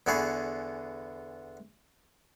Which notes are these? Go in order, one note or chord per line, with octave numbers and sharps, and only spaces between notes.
E2 D3 B3 G#4 C#6